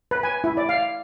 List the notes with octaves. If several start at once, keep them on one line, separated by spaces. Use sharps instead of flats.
B4
G#5
E4
D5
F5